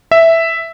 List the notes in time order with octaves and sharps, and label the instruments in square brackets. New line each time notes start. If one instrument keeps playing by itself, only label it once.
[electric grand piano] E5